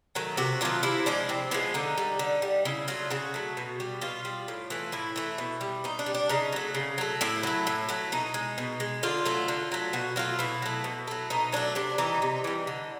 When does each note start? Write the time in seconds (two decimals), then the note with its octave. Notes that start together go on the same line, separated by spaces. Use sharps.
0.15 D#3 F#3 A3
0.37 C3 F#4
0.61 D#3 F#3 A3 F4
0.83 C3 E4
1.06 F3 G#3 D4
1.29 C3 C4
1.51 F3 G#3 B3
1.74 D3 D#4
1.98 G3
2.19 D3
2.42 G3
2.65 C#3 E4
2.88 F#3 A3 F4
3.10 C#3 F#4
3.34 F#3 A3
3.57 B2
3.80 G3
4.01 B2 F4
4.25 G3
4.48 A2
4.70 E3 A3
4.92 A2 E4
5.16 E3 A3
5.38 B2
5.61 G3
5.84 B2 D#4
5.99 D4
6.06 G3
6.14 D4
6.29 C#3 D#4
6.52 F#3 A3
6.75 C#3
6.98 F#3 A3
7.21 A2 E4
7.43 F#3 A3
7.67 A2
7.89 F#3 A3
8.12 B2 D#4
8.34 G#3
8.58 B2
8.80 G#3
9.03 D3 F4
9.25 F#3 A3
9.48 D3
9.72 F#3 A3
9.93 B2 F#4
10.16 F#3 A3 F4
10.39 B2 E4
10.62 F#3 A3
10.84 B2
11.07 F#3 A3
11.30 B2 D#4
11.52 F#3 A3 D4
11.75 C3 D4
11.98 E3 G3 D#4
12.22 C3
12.44 E3 G3
12.67 D3